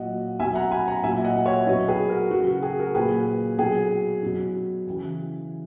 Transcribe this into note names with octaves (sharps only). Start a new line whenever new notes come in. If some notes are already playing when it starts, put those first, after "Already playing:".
Already playing: A#2 F#3 D#5 F#5
B2 F#3 E5 G#5
F#5 A#5
G#5 B5
F#5 A#5
A#2 F#3 E5 G#5
D#5 F#5
F#5
C#5 E5
B2 F#3 B4 D#5
G#4 B4
F#4 A#4
C#3 F#3 F#4
F#4
G#4
F#4 A#4
A#2 F#3 G#4 B4
B2 F#3 G#4
B2 F#3
C#3 E3